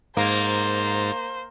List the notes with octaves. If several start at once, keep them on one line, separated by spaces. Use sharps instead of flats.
G#2 A#3 C5 A#5 A6